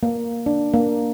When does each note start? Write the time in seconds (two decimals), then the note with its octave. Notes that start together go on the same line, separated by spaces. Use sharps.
0.03 A#3
0.46 D4
0.74 A#3